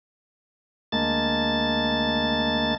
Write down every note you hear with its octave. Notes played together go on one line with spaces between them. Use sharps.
D2 G#3 A#3 A5 A6